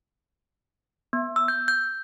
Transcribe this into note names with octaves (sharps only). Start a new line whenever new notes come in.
B3
E6
G6
G6